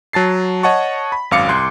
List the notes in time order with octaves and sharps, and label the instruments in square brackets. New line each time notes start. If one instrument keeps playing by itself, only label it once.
[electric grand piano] F#3 A5 A6 C7
C#5 D#5 F#5 A5 C#6
B5
G#1 F#2 F5 D6 C#7
C2 C6 F#6